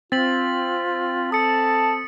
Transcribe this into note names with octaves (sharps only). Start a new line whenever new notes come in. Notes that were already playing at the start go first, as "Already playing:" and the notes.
C4 F4 A6 B6 F#7
A4 A5 D#6 C#7